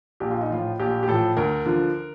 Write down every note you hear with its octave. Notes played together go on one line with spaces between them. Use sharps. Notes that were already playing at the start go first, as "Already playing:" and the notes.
A#1 G4
F4
D#4
A2 F3 F4
A#1 G4
G4
A2 F3 A4
D2 A#4
D3 F3